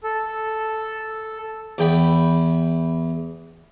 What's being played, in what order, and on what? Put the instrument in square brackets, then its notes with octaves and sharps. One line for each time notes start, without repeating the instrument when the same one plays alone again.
[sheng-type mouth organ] A4
[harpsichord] E2 G5 B5